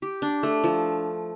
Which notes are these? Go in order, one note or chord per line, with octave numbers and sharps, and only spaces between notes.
G4
D4
A3
F3